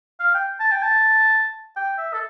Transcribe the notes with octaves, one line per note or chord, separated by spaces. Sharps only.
F5
G5
A5
G5
A5
G5
E5
A4